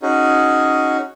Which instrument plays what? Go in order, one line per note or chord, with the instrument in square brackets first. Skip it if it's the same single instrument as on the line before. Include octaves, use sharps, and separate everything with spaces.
[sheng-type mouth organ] C#4 D#4 F#4 G#4